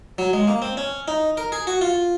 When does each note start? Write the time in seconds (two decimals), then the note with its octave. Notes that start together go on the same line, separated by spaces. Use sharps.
0.18 F#3
0.33 G#3
0.47 A#3
0.62 C4
0.77 C#4
1.08 D#4
1.37 A#4
1.52 G#4
1.67 F#4
1.81 F4